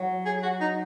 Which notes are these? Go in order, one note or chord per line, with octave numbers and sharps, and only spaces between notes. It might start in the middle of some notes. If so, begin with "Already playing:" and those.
Already playing: F#3
G#4
F#4
D#4